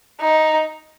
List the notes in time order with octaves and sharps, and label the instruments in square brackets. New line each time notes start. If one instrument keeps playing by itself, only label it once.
[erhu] D#4